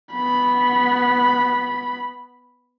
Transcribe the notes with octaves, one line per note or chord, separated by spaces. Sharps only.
B3 B5